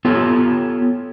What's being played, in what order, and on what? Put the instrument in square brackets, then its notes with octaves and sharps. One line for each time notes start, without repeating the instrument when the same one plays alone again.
[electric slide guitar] B3 F4 G4 A4 C#5